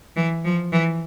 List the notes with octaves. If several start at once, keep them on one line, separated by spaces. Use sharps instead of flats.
E3
F3
E3